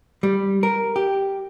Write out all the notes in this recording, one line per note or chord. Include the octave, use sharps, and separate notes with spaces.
G3
A#4
G4